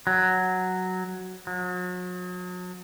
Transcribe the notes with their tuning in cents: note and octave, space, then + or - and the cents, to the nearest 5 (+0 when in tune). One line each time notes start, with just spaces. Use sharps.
F#3 +0
F#3 -40